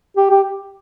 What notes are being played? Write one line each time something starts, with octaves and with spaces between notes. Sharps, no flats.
G4
G4